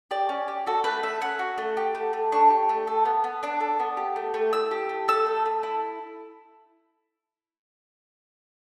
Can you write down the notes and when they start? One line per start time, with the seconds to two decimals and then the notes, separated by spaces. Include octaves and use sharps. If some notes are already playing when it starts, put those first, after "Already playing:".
0.11 G4 D5
0.29 C#4
0.48 G4
0.66 F#4 A4
0.84 A3 B4
1.03 A3 E5
1.21 C#4 F#5
1.39 F#4
1.58 A3
1.77 G4
1.95 A3
2.13 A3
2.32 D4 C#6
2.50 G4
2.69 A3
2.87 A4
3.05 B3
3.24 B3
3.43 D4 D6
3.60 A4
3.80 B3
3.97 G4
4.16 A3
4.34 A3
4.53 E4 E6
4.71 G4
4.89 A3
5.08 A4 E6
5.26 A3
5.46 A3
5.63 E4